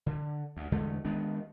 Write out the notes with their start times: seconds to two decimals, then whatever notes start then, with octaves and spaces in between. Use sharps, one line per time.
0.06 D3
0.57 D2
0.72 E2 D3 G#3 A3
1.05 D#3 G#3 B3 D4